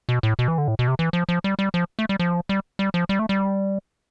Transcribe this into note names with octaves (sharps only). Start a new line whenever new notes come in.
B2
A2
B2
E3
D3
A2
B2
C3
E3
F3
F3
G3
G3
F3
A3
G3
F3
G3
G3
F3
G3
A3
G3